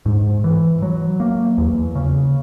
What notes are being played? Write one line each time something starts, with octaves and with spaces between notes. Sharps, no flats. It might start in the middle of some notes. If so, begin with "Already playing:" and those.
G#2
E3
F#3
A#3
E2
C#3